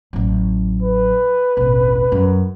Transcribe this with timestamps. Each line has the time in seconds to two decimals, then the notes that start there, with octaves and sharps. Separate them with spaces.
0.13 A1 F#3
0.82 B4
1.57 E1 A1
2.12 F#2